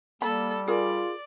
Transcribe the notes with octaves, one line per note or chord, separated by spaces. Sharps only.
G3 A#3 A4 B5
F4 G#4 A#4 D5